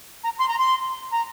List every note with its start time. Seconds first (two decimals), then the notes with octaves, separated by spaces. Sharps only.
0.23 A#5
0.38 C6
0.48 A#5
0.58 C6
1.12 A#5